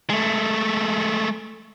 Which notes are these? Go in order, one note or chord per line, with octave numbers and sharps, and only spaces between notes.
G#3 A3